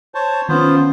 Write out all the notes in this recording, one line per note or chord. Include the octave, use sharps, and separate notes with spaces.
C5 C#5 A5
D#3 B3 C#4 F4 C5